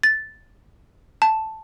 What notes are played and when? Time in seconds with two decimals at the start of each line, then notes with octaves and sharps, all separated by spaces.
0.03 A6
1.22 A5